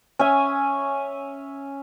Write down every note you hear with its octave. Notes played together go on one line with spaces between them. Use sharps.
C#4 E5 G#5